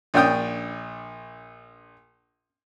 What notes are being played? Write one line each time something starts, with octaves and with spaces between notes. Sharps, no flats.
A#1 D4 C#5 G5 D#6